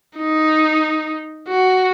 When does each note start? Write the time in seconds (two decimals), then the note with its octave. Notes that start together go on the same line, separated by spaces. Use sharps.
0.17 D#4
1.48 F#4